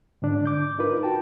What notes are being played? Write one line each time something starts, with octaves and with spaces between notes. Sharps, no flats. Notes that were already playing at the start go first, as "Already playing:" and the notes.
G#2 D3 D4
D6 G6
D#4 F4 A#4 B4
F#4 G5 A5